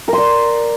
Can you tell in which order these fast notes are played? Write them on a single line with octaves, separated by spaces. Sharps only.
A#4 C6 D5